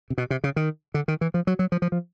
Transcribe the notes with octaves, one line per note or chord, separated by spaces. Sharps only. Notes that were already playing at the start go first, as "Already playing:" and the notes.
C3
B2
C3
C#3
D#3
D3
D#3
E3
F3
F#3
F#3
F3
F3
F3